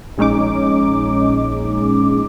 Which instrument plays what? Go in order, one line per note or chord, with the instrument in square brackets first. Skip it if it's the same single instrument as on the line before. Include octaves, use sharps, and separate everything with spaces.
[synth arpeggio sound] A#1 G#3 C#4 D#4 D6